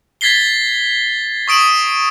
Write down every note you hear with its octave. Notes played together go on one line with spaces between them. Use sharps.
G#6 A6 B6 C7 G7
C#6 D#6 D7 E7 F#7